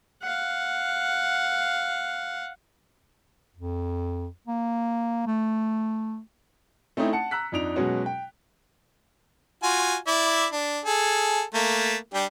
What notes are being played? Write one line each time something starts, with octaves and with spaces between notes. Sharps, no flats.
F5 F#5
F2
A#3
A3
A3 C4 C#4 D#4 E4
F#5 A5 C#7
A#5 E6 F#6 B6
F2 D4 D#4 D7 F7
B2 F#3 G#3 C#4 F#4
G5
F4 F#4 G#5
E4 D5 E5
D4
G#4 A4
A3 A#3
G3 D4 G4